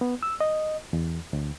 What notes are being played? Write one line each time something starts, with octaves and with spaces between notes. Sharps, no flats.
B3
E6
D#5
E2
D2